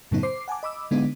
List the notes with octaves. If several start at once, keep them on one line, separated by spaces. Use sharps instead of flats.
F#2 A2 C#3 F#3 B3 D#4
C5 D6 C7
F#5 G#5 A5 D6
D#5 B5 D6 E6
D3 G#3 B3 D4 D#4